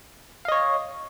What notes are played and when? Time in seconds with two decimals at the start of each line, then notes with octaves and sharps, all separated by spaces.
0.45 F5
0.48 D#5
0.52 C#5